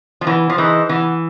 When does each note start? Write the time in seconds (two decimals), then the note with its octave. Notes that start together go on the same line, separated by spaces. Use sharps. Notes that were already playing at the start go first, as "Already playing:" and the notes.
0.21 F3
0.26 E3 B3
0.49 F3
0.58 E3 D#4 G#4 C5 D#5
0.89 E3 B3